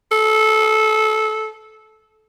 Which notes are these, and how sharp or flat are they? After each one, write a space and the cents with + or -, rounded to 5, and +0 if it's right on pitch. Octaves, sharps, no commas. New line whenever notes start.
A4 -20